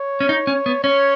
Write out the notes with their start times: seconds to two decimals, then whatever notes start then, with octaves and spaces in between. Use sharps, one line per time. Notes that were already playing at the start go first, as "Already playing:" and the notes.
Already playing: C#5
0.20 C#4
0.29 D#4
0.47 C#4
0.66 B3
0.84 C#4 C#5